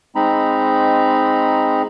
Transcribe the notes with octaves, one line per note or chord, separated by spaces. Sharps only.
G#3 C4 D#4 A#5 B5